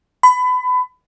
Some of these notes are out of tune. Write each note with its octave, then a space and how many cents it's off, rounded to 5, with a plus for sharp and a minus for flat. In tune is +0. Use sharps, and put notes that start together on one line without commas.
B5 +25